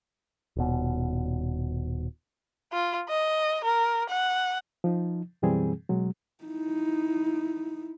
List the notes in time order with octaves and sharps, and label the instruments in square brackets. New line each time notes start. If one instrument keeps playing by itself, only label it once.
[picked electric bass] D#1 B2
[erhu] F4
D#5
A#4
F#5
[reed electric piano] F3 D#4
F#2 B2 E3 G3 C4 G#4
B2 F#3 G#3
[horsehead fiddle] D#4 E4